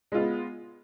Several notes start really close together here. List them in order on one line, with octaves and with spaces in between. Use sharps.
G#3 F4 B3